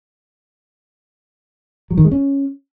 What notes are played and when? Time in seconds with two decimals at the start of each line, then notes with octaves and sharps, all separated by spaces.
1.91 F#3
1.98 D#3
2.05 G#3
2.12 C#4